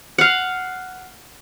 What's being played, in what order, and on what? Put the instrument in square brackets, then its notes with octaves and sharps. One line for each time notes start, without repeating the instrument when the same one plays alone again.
[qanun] F5 F#5